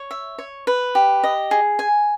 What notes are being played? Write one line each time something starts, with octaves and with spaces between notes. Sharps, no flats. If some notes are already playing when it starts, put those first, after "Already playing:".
Already playing: C#5
E5
C#5
B4
G4
D#5
G#4
G#5